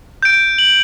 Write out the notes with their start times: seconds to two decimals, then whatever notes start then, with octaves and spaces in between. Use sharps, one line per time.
0.22 G6 D7
0.58 F#7